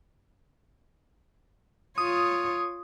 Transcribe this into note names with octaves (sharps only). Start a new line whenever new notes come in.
F4 C#5 D#6